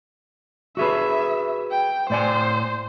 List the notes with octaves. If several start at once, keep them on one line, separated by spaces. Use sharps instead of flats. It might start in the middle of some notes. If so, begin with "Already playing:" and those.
F#4 G#4 B4 E5
G5
A2 C5 D5 G#5